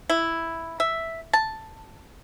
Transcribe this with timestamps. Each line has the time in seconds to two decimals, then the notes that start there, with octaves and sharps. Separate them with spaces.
0.09 E4
0.80 E5
1.33 A5